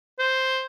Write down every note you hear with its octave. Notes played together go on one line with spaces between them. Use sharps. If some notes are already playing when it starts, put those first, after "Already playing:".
C5